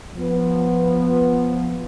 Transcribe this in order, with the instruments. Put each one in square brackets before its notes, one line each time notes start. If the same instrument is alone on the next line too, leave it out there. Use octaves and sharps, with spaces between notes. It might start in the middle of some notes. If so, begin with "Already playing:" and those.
[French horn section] F3 B3